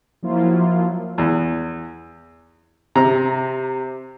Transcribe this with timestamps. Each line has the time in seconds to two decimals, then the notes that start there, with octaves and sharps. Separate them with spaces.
0.22 F3 F#3 A#3 E4 F4
1.18 E2
2.95 C3 A#5